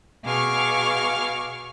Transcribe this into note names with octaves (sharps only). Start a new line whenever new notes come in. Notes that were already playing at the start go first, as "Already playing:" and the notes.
B2 G#4 F5 C#6 D6 F6